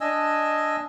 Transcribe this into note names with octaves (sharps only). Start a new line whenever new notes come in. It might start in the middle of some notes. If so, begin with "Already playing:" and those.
D4 D#5 G#5 E6